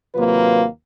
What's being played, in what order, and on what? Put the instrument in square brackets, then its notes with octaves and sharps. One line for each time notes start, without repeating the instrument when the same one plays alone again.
[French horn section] D#2 C3 F#3 A#3 F4 B4